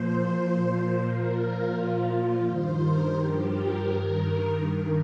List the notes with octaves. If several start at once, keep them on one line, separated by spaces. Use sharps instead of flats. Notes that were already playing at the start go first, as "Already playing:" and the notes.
Already playing: A#2 F3 C5
A#2
F3
C5
A#2 F3 A#4
F4
A#2 F3
G2 D#3 C5
A#4
G2 F3 G4
A#4
G2 D#3 A#4
G2 D#3